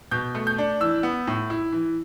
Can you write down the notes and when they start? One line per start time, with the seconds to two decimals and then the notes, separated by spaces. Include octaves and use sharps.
0.11 B2 G6
0.35 A3
0.47 G6
0.58 D4
0.80 E3 E6
1.03 B3
1.27 A2
1.50 E4
1.72 E3